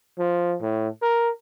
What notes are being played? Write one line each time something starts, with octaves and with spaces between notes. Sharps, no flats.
F3
A2
A#4